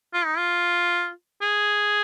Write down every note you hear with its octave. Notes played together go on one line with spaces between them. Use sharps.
F4
D#4
F4
G#4